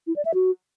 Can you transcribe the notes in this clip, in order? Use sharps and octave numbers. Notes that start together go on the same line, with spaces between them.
E4
D5
E5
F#4